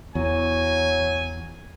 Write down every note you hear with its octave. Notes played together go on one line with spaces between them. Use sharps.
E2 F#3 G#5